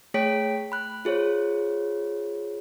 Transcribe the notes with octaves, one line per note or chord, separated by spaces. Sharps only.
A3 G#4 C#5 G5 B6 D7
B5 F#6
F4 G#4 C5 C#5